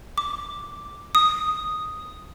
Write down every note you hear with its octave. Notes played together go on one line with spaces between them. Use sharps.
D6
D#6